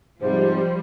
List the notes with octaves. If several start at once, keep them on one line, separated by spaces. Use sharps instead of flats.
G#2 C3 F3 G3 C5